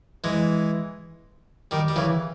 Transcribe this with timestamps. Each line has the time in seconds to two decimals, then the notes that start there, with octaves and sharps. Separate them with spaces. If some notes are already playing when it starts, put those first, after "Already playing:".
0.24 E3 G#3
1.71 D#3 G3
1.88 G3
1.96 C#3 E3